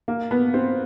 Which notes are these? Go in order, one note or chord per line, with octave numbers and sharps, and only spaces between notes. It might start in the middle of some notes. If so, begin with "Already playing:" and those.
A#3
B3
C4